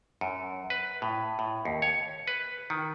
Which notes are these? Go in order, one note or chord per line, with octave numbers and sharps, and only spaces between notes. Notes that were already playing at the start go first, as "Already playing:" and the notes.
F#2
B4
A2
A2
D#2
C#5
B4
D#3